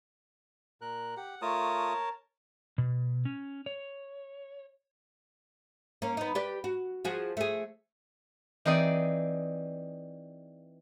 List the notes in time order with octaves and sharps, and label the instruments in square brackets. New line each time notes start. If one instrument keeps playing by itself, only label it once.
[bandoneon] A#2 A#4 F#6
[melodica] G4 [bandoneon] F#5
[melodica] A3 F4 D#6 [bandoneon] A#4 C#5 A5
[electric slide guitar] B2
C#4
C#5
[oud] A#3 C#4
B3 D#4
G4 B4 D5
F#4
F3 F#4 G#4
A3 G#4
[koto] E3 C4 D#4 G#4 D5